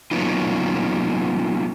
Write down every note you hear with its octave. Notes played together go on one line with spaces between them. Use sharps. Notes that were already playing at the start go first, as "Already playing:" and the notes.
F#3 A#3 B3 C#4 D#4 F4